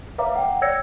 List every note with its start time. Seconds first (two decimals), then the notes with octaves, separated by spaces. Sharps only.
0.18 B4 C#5 E5 F5 A#5 D6
0.36 F#5 G5
0.62 C#5 D5 E6 G#6 A#6 C#7